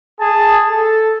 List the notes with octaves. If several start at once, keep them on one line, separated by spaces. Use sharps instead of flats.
G#4 A5
A4 A5